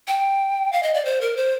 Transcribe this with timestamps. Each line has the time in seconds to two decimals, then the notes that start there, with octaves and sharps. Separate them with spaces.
0.07 G5
0.72 F5
0.83 D#5
0.94 D5
1.05 C5
1.21 A#4
1.37 C5